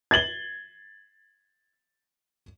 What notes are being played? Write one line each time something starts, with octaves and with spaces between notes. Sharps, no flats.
G#6 A6 F#7 G7